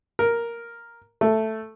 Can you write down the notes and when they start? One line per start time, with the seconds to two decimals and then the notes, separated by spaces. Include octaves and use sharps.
0.19 A#4
1.21 A3